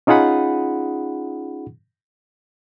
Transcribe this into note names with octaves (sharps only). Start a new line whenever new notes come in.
C#4 D#4 F4 G#4 F#5 B5